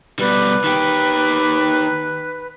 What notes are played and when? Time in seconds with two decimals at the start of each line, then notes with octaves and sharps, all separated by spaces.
0.19 B2 G3 B4
0.64 D#3 G4